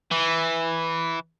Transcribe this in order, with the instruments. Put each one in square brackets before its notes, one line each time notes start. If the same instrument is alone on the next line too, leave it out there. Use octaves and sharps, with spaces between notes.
[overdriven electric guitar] E3